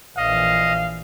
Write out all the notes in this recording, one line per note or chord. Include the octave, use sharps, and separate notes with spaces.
A#1 E3 D#5 F5